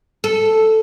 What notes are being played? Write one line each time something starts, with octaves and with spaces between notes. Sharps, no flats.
A4